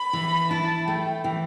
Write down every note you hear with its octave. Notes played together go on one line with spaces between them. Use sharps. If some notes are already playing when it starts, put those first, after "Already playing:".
Already playing: B5
E3
E4 A5
A3 G5
E3